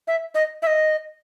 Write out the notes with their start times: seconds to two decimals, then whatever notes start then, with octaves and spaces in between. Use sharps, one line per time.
0.07 E5
0.35 D#5
0.62 E5
0.67 D#5